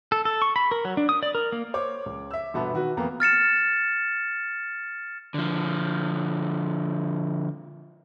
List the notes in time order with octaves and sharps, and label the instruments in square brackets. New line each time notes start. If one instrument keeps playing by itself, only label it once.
[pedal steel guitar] A4
A4
C#6
B5
A#4
F#3
D4
D#6
D5
A#4
A#3
[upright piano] C5 C#5 D6
C#2
E5 E6
G1 B2 B3 E5 A5 B5
D#3 F#4 B4
F2 A#3 B3 A#5
[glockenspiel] F6 A6 C#7 E7
[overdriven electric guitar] D3 F3